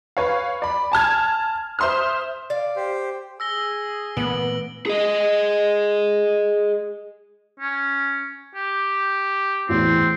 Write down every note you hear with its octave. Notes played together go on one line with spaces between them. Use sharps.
B4 C#5 F5
D5 B5
G#5 A5 F6 G#6
C5 E5 C6 D#6 F6
D5 F5
G4 C5
G#4 E6 A#6 G7
A#2 E3 A3 B3 D7 F#7
G#4 D#5
C#4
G4
A1 E2 C4